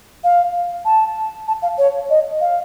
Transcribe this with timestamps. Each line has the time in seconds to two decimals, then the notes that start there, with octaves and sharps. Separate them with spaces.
0.24 F5
0.85 A5
1.48 A5
1.62 F5
1.78 C#5
2.10 D#5
2.41 F5